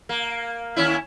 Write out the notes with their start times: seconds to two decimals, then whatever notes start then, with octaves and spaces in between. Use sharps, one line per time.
0.09 A#3
0.76 D#2 C#4 E4